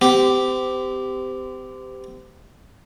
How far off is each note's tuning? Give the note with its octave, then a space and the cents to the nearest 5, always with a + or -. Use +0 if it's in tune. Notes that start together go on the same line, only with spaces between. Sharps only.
C4 -35 G4 +0